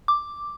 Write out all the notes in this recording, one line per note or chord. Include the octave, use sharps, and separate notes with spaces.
D6